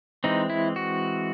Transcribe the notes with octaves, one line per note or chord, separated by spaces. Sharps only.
E3 G#3 C4 D#4
E4
F#4